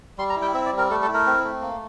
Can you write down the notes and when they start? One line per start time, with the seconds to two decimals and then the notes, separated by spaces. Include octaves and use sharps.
0.18 G3 C6
0.30 A#5
0.36 E4
0.42 G5
0.54 C4 E5
0.66 D5
0.72 G3
0.78 A#4
0.90 A3 A4
1.02 A4
1.09 E4
1.14 A#4
1.26 C4
1.44 A3
1.62 A#3